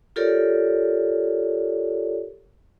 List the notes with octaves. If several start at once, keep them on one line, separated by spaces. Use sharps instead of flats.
F4 G4 A4 A#4 C#5 D5